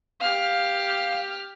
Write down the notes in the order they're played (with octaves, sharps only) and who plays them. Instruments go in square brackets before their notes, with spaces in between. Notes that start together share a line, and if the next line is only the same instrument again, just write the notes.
[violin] G4 F6 [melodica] F5